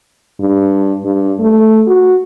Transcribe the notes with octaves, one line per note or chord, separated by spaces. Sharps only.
G2
G2
A3
F#4